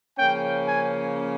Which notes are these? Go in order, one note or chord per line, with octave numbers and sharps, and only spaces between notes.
C#3 F3 A#3 C#4 G5
G#5